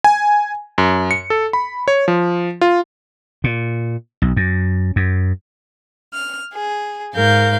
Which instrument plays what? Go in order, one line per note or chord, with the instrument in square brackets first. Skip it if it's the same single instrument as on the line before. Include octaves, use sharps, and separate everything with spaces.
[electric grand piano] G#5
F#2
C#7
A4
B5
C#5
F3
F4
[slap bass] A#2
B1
F#2
F#2
[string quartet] F6
G#4
G#2 A#4 F5 G6